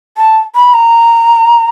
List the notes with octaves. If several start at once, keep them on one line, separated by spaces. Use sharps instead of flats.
A5
B5
A#5